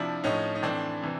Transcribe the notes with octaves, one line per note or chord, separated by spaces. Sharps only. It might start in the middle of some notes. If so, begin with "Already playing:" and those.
Already playing: C3 F3 D4 E4
A2 F3 C#4 D#4
D#4
A2 E3 C4 D4
C3 E3